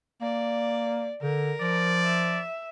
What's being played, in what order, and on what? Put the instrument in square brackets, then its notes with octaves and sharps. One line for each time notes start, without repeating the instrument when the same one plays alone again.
[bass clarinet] A#3 [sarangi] D5
[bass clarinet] D3 [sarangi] A#4
[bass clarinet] F3 [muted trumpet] D5
[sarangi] E5